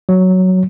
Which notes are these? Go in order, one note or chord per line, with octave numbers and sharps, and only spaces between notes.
F#3